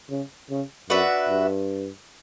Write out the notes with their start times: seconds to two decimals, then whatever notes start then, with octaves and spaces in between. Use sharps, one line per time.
0.10 C#3
0.50 C#3
0.89 F#2 D4 F#4 B4 E5
1.29 G2